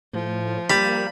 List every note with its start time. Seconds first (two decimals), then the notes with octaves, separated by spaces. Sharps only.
0.13 A2 F3
0.70 G3 A#3 B5